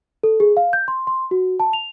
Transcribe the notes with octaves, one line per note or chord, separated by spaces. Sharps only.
A4
G#4
F5
G6
C6
C6
F#4
A5
F7